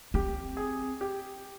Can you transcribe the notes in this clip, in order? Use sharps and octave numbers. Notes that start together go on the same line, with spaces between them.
C4 G4
G#4
G4